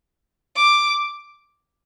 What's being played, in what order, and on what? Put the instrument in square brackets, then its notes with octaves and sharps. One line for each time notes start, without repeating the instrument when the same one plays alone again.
[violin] D6